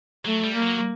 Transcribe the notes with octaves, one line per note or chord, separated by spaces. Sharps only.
F#3 A3
G3
A#3
F#3